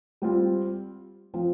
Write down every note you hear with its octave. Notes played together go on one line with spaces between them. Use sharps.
G3 C4 F4
F3 C4 F4